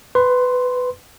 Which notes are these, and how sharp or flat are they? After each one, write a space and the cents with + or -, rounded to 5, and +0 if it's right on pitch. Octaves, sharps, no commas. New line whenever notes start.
B4 +15 C6 +0